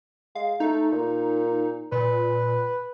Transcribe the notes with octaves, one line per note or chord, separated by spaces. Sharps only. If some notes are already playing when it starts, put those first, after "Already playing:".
G#3 F5
A3 D#4
A#2
A#2 B4